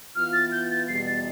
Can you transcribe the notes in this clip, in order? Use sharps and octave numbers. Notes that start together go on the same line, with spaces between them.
E3 B3 F4 F6
A6
G6
A6
E2 B2 G3 C7
A6